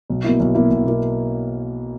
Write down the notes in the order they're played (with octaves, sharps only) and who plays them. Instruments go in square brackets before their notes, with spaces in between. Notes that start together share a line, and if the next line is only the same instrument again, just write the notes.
[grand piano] B1
B2 A#3 E4
B1
B2 A#3 E4
B1
B2 A#3 E4